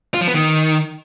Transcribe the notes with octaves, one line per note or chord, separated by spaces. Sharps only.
F4
F3
B3
D#3